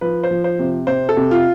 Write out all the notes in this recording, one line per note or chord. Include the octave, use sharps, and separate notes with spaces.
F3 B4
C5
F3
C5
C3
C3 C5
A4
C3
F4